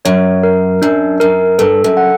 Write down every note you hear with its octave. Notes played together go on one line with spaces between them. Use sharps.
F#2 C#5
A#4
F#2 D4
F#2 A#4
G2 A4
F#2
F#5